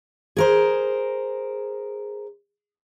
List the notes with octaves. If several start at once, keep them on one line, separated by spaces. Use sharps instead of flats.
G#4 A#4 C5